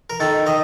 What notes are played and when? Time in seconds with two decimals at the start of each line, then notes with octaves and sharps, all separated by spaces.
0.10 A#4
0.20 D#3 A4
0.46 D#3 D#5